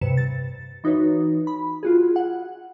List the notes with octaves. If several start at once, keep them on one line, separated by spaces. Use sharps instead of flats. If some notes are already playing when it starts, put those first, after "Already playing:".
G2 C3 B4 C#7 E7
A6
E3 D#4 F#4 B4 C#5
B5
F4 F#4 G#4
F#5